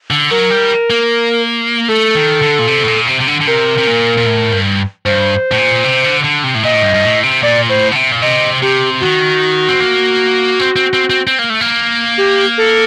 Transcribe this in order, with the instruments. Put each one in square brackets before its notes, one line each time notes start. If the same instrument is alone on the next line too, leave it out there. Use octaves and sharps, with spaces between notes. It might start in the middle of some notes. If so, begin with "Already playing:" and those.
[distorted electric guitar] D3
[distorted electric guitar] F#3 [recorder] A#4
[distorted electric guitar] G3
A#3
[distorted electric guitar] A3 [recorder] A4
[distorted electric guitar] D#3
D3
A#2
C3
A2
A#2
C3
C3
D3
D3
[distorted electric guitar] C3 [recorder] A#4
[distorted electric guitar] C3
A#2
A#2
A2
G2
[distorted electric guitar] G2 [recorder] C5
[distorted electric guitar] A2
A#2
C3
D3
D3
C3
A2
[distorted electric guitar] A#2 [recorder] D#5
[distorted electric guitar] A2
G2
G2
A2
C3
[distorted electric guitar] A#2 [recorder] D5
[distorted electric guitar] A2 [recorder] C5
[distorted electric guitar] D3
C3
A#2
[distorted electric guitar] C3 [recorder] D#5
[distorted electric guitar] C3 [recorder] G4
[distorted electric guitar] D#3 [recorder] F#4
[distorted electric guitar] C4
A#3
C4
C4
C4
C4
C4
A#3
A3
A#3
[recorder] G4
A4